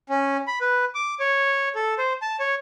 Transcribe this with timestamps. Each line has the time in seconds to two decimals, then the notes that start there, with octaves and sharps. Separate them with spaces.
0.09 C#4
0.47 B5
0.61 B4
0.95 D6
1.20 C#5
1.75 A4
1.98 C5
2.22 A5
2.40 C#5